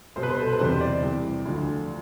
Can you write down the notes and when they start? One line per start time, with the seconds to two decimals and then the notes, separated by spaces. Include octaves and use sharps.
0.16 C2 B2 G3 C5
0.23 B4
0.30 C5
0.38 A4
0.53 B4
0.59 E2 C3 E3 G3 C5
0.81 D5
1.02 C2 C3 E3
1.46 D2 D3 F3